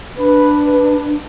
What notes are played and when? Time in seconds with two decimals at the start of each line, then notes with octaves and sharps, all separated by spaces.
0.18 D4 B4
0.65 B4